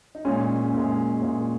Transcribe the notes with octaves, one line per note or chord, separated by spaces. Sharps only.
D#4
A#2 G#3 C#4
A#2 G#3
A#2 G#3